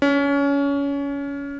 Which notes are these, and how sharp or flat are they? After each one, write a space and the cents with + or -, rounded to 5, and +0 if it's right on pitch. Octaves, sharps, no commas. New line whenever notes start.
C#4 +25